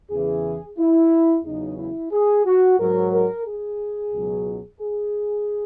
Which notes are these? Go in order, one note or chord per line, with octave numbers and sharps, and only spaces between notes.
E2 C#3 E3 G#4
E4
E2 C#3 F#3 D#4
E4
G#4
F#4
G#2 F#3 A#4
A#4
G#4
C#2 B2 F#3
G#4